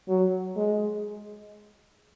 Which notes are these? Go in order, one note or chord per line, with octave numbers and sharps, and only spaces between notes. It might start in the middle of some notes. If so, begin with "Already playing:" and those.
F#3
G#3